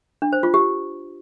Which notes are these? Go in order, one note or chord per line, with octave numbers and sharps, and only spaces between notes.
D4
C5
F4
G4